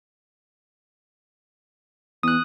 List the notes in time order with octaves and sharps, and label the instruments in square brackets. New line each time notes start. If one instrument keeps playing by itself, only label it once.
[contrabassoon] E2 [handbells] D#6 F#6